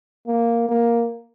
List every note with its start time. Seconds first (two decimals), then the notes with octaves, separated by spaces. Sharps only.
0.27 A#3
0.69 A#3